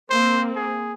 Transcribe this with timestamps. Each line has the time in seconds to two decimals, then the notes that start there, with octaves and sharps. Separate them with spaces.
0.10 A#3 C4 C5
0.56 G#4